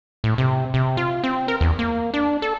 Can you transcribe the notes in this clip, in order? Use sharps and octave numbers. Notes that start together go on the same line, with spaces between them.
A2
C3
C3
F4
C4
A#4
E2
A#3
D4
A4